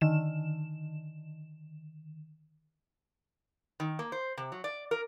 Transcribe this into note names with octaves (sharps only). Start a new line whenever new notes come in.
D3 D#3 E7
D#3
A#3
C5
C3
F#3
D5
A#4